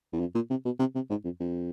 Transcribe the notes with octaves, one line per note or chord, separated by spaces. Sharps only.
E2
F2
A#2
C3
B2
C3
C3
G#2
F2
F2